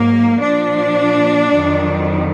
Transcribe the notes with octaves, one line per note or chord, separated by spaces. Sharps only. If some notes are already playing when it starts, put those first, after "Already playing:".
Already playing: G#2 F#3 A#3
A#2 F3 D4
F2 D#3 F#3